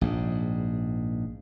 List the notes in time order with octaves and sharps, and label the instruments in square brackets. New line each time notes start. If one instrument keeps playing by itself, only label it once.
[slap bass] A#1 G#2